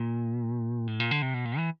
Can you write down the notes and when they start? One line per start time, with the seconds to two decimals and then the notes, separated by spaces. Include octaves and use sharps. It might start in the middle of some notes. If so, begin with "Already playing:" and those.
Already playing: A#2
0.87 A2
1.00 A#2
1.11 D3
1.22 C3
1.34 B2
1.45 A#2
1.57 E3